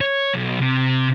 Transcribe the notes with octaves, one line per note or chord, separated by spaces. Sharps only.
C#5
B1
C3